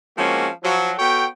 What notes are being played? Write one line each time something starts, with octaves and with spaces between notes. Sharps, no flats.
F3 G#3 A#3 C4 C#4 F#4
F3 F#3
B3 F#4 A4 C#5 G5